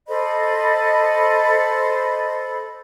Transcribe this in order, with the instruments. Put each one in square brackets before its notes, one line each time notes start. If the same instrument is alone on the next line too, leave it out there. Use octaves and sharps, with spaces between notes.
[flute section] A4 C5 D#5 B5